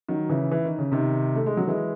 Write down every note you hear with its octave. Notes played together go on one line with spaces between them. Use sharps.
D#3 F#3
C#3 E3
E3
D#3
C#3
C3 D#3
A3
G#3
F#3
E3 G#3